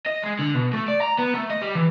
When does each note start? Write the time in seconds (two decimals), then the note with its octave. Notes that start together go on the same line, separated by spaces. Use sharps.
0.07 D#5
0.24 G#3
0.39 D3
0.55 B2
0.73 A3
0.88 D5
1.02 A#5
1.19 B3
1.34 A3
1.50 D#5
1.61 G3
1.75 E3